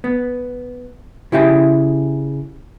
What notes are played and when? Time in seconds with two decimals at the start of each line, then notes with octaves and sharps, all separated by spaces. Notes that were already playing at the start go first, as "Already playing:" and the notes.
0.04 B3
1.32 C#3 E4 G4 E5 G5